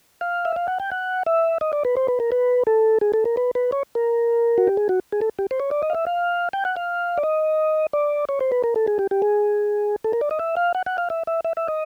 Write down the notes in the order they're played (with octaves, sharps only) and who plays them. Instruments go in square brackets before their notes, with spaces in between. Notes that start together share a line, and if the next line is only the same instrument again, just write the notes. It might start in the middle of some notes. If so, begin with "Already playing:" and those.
[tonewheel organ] F5
E5
F5
F#5
G5
F#5
E5
D#5
D5
B4
C5
B4
A#4
B4
A4
G#4
A4
A#4
B4
B4
C#5
A#4
F#4
G4
G#4
F#4
G#4
A4
G4
C5
C#5
D5
D#5
F5
E5
F5
G5
F#5
F5
D5
D#5
D5
C#5
C5
B4
A#4
A4
G#4
G4
G4
G#4
A4
A#4
D5
D#5
E5
F5
F#5
F#5
F5
E5
E5
E5
E5
D#5